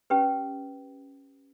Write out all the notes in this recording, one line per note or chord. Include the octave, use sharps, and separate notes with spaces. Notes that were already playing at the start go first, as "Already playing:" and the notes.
C#4 G4 B4